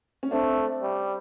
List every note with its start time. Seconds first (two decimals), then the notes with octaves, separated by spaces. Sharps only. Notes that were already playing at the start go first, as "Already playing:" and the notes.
0.23 C#4
0.31 A3 C4 D4
0.82 G3